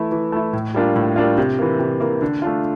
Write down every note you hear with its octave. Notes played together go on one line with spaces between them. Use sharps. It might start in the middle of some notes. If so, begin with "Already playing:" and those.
Already playing: E3 A3 E4
E3
A3 E4
A2
G3 A#3 D4 F4
A2
G3 A#3 D4 F4
C3
E3 A#3
C3
E3 A#3
D3
A3 D4 F4